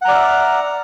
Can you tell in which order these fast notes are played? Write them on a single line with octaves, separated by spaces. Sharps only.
F#5 A#5 D5 F6 E5